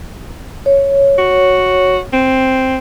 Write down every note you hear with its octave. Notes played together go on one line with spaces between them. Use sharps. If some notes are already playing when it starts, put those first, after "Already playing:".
C#5
F#4
C4